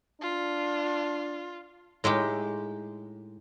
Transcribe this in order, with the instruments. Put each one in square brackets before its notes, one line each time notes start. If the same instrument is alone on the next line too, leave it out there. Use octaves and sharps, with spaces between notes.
[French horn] D4 [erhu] F4
[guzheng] A2 G#3 D#4 G4